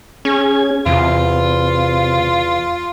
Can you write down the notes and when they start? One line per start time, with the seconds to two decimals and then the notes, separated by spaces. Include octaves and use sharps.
0.25 C#4 G#4 G#6
0.86 E2 C3 F4